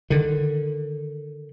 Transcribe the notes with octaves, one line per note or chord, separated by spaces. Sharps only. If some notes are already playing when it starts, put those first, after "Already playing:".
D3 D#3